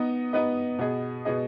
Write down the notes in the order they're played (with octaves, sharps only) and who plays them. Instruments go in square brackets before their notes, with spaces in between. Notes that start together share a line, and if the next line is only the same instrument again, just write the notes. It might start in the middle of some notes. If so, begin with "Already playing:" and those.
Already playing: [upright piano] B3 D#4 B4 D#5
B3 D#4 B4 D#5
B2 B3 G#4 D#5
B2 B3 G#4 D#5